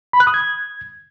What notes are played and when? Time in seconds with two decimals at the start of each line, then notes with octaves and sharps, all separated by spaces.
0.13 B5
0.20 F#6
0.27 D#6
0.34 G#6